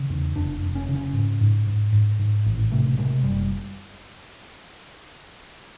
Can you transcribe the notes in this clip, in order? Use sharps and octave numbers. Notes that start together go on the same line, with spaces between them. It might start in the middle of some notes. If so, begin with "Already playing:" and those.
Already playing: C#3
E2
F1 D4
F1
C#4
C#3
C#4
G#2
G#2
G#2
G#2
G#2
A1
C3 A3
C3 G#3
F#1 G3